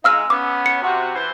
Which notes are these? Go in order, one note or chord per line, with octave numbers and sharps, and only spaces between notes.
G#3 D#4 F5 E6 F6
B3 C#4 D6
C#7
C3 F#4
E3 C5